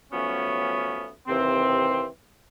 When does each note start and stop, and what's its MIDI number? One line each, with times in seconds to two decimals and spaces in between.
0.13 1.09 53
0.13 1.09 54
0.13 1.09 57
0.13 1.09 59
0.13 1.09 61
1.28 2.05 39
1.28 2.05 48
1.28 2.05 52
1.28 2.05 60